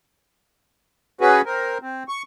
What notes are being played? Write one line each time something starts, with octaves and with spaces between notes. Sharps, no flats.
C#4 F#4 G#4 B4
C4 A#4
C4
C#6